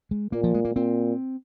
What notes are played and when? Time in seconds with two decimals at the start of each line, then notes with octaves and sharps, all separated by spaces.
0.11 G#3
0.32 A#2 A#3
0.44 F3
0.54 G#3
0.65 A#3
0.75 A#2 C4